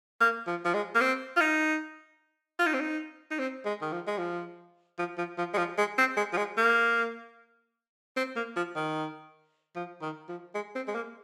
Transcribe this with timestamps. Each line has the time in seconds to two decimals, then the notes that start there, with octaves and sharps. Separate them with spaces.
0.20 A#3
0.47 F3
0.65 F3
0.74 G#3
0.95 A#3
1.00 C4
1.36 F4
1.40 D#4
2.59 F4
2.66 D#4
2.74 C4
2.80 D#4
3.31 D#4
3.39 C4
3.65 G#3
3.82 D#3
3.92 F3
4.07 G#3
4.18 F3
4.98 F3
5.18 F3
5.38 F3
5.53 G#3
5.57 F3
5.78 G#3
5.98 C4
6.17 G#3
6.33 F3
6.37 G#3
6.57 A#3
8.16 C4
8.36 A#3
8.56 F3
8.76 D#3
9.75 F3
10.02 D#3
10.28 F3
10.54 G#3
10.75 C4
10.88 G#3
10.95 A#3